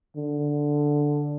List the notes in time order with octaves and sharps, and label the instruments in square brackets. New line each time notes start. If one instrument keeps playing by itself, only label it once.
[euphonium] D3